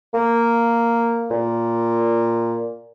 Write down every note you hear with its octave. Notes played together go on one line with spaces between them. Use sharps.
A#3
A#2